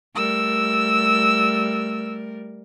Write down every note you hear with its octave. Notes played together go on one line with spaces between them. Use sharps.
G3 A3 A#4 E6